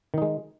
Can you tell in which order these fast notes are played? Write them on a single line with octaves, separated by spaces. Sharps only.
D#3 D#4 G#3